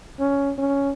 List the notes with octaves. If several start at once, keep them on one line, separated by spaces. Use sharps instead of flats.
C#4
C#4